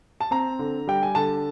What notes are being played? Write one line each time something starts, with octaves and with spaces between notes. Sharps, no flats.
A5
C4 A#5
D3
G3 G5
G#5
D3 A5